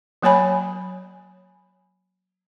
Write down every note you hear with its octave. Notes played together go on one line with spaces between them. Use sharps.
F#3 A#3 C#5 G#5 B5